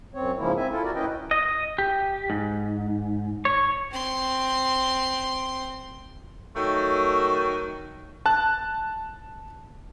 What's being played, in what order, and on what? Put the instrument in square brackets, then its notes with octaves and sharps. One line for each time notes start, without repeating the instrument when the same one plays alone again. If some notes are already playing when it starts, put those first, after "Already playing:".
[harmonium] F#2 C4 C#5
G#2 C#3 F3 G#3 A#3 E4
C4 E5 G#5
E4 F4 A4
F#4 A#4 D5
A2 C#4 E4 B4 D#5 G5
[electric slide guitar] D#5
G4
G#2
C#5
[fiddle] C4 C6
[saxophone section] D#3 F#3 A3 F#4
[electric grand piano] A5 F#6